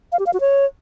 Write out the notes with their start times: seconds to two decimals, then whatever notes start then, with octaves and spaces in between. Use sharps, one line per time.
0.12 F5
0.19 G4
0.26 F5
0.33 F#4
0.40 C#5